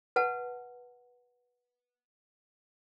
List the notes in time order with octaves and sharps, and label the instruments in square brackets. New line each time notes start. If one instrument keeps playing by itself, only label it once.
[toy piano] B4 F#5 A5